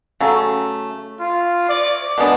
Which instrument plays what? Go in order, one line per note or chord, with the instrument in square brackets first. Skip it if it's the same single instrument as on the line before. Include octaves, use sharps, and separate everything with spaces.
[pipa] C#3 F#3 A3
[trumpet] F4
D5
[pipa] B2 G#3 B3 D4